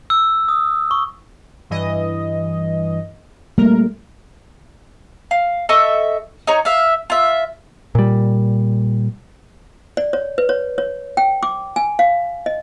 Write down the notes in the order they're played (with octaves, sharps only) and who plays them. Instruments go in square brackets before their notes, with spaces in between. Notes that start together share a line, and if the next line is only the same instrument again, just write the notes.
[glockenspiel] E6
D#6
C#6
[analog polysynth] G2 E3 D#5
[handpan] G3 A3 A#3 [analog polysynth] A#4
[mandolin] F5
A4 D#5 E5 C#6
D#4 C#5 A#5
E5 F5
F4 E5
[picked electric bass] A#2 G3
[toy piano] D5
C#5
B4
C#5
C#5
G5
D6
G#5
F5
D#5